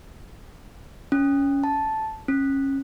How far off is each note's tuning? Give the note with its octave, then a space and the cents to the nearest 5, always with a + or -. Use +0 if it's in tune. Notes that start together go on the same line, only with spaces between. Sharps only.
C#4 +15
A5 -5
C#4 -25